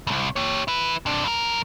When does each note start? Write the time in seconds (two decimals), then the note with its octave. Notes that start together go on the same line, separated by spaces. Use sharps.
0.07 C2 F2
0.36 G4 C#5
0.68 E4 B4
1.06 C3 D4
1.24 F2 A#4